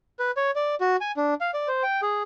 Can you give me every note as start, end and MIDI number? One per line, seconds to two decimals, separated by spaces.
0.19 0.31 71
0.37 0.51 73
0.56 0.75 74
0.81 0.96 66
1.01 1.12 80
1.17 1.34 62
1.41 1.51 77
1.54 1.68 74
1.68 1.83 72
1.83 2.01 79
2.02 2.23 68